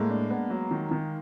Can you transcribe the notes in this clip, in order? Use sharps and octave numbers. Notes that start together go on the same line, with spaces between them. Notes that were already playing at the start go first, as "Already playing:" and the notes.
Already playing: A2 G#3 A#3
D4
B3
F#3
D#3
D#3